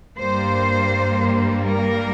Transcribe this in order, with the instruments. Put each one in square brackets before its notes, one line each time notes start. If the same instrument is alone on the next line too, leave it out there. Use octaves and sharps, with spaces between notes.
[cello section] G2 G3 A#3 C5
A#4